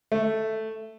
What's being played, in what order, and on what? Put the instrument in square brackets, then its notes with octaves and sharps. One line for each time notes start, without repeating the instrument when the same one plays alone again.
[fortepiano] A3